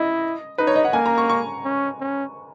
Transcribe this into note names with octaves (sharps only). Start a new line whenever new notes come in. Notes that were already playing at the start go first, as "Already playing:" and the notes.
Already playing: E4 D#5
D#4 B4
C#5
D#5
F#5
A#3 G#5
A#5
C#6
C#6
C#4
C#4